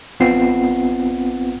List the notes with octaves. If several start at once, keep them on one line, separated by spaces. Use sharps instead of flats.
A1 B3 C4 F4 F#5 C7